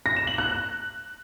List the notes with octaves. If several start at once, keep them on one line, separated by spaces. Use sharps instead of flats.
A#6
E7
F#7
F#6